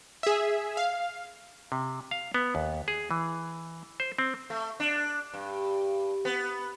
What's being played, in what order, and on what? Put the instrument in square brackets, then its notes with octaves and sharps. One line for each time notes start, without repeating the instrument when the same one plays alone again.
[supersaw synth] G#4 E5
F5
[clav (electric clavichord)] C3
F5
B3
D#2
G#4
E3
C5
C4
[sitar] A3
D4
G2
B3